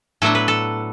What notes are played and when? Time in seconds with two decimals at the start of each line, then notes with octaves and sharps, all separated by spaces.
0.22 A2 F#3 B3 D4 A4
0.35 B4
0.48 A4